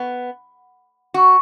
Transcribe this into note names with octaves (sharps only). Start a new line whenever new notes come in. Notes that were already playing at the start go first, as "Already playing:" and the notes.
Already playing: B3
F#4